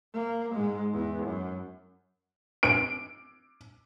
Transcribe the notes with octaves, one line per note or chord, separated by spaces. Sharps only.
A#3
G#2 G#3
E2
F#2
D7